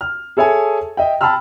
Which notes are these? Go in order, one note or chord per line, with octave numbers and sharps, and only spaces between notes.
F6
G#4 A4 C#5 E5 G#5 A5
D#5 E5 G5
G5 A5 B5 C6 E6 F6